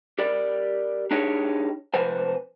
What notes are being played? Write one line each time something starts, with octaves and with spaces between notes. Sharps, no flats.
G4 A#4 D5
D4 D#4 G4 G#4 C#5
C3 F3 B4 C5 G#5